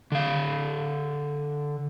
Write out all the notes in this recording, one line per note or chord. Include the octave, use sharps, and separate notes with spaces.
D3 F5